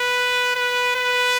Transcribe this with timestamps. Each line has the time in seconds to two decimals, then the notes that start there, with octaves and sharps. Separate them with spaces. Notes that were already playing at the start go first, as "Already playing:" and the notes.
Already playing: B4
0.56 B4
0.96 B4